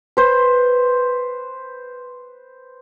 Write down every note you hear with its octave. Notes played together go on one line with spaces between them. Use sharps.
B4 C5